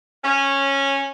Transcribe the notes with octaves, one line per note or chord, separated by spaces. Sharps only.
C#4